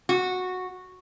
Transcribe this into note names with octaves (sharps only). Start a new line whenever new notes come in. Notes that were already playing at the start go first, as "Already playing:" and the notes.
F#4